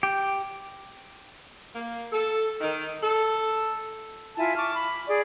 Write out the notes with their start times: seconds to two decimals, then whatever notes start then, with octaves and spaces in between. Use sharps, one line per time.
0.03 G4
1.74 A#3
2.12 A4
2.61 D#3
3.02 A4
4.36 E4 F4 G#5 A5
4.56 A5 C#6 D6 F6
4.75 B5
5.07 G#4 D5